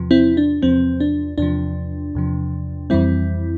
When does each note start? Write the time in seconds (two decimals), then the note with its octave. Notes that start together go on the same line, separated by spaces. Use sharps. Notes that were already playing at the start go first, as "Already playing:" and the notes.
Already playing: E2 C3 F3
0.11 C4 E4
0.37 D4
0.62 E2 C3 F3 C4
1.00 D4
1.38 E2 C3 F3 D4
2.15 E2 C3 F3
2.90 F2 E3 G3 C4 E4